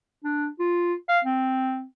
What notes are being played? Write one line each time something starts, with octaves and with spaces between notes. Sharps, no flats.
D4
F4
F5
C4